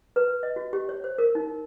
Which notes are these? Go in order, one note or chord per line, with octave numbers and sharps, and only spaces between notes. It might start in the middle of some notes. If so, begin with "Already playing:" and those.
B4
D#5
F#4
G4
C#5
C5
A#4
D#4